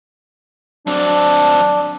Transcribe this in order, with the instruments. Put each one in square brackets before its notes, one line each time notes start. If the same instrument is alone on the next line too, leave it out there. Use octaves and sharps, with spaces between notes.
[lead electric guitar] F#3 C4 [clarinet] D4 [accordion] D5 A5